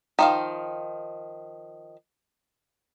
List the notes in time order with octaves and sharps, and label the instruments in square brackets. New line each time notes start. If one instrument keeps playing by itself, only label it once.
[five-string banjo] D#3 F3 F5